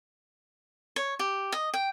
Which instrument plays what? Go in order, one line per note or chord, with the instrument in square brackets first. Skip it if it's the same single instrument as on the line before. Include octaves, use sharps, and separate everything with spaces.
[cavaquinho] C#5
G4
D#5
G5